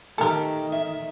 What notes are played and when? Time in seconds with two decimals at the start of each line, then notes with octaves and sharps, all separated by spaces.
0.18 D#3 A3 G4 A4 A#4
0.72 E5